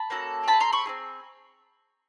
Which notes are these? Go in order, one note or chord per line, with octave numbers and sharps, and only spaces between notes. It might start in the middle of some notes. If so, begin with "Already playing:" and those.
Already playing: A5 B5
A#3 C#4 F#4 A4
C4 E4 G#4 A5 B5
A#5 C6
B5 C#6
C4 E4 G#4